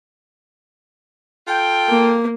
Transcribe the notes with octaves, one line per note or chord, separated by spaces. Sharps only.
F4 A4 G5
A#3